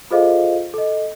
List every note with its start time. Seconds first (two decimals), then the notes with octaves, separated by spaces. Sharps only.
0.11 F4 G#4 A4 C5 D#5 F5
0.74 A4 D#5